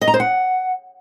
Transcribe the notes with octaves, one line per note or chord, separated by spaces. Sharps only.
D#5
A#5
C5
F#5